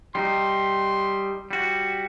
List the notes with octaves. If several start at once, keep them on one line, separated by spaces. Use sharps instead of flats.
G3 D#4 C6
G3 F#4